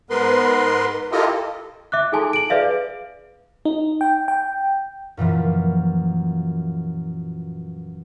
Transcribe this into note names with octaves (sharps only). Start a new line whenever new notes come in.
G#2 B3 A#4 B4 C6
E4 F4 G4 A4 A#4 D#5
E5 D6 F#6
D#4 G#4 A4 G#5 A5 C6
D7 F#7
G#4 B4 D5 E5 F5
D#4
G5
G5
F#2 A#2 E3 F3